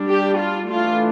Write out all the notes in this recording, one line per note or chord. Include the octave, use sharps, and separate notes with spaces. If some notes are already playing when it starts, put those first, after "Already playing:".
Already playing: G3 D4
G4
F4
E3 A3 D4 F4